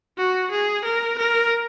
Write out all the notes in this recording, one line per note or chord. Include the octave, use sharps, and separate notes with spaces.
F#4
G#4
A#4
A#4